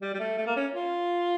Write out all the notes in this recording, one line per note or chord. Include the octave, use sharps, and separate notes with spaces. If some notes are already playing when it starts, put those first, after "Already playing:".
G3
G3
A3
A3
A#3
C#4
F4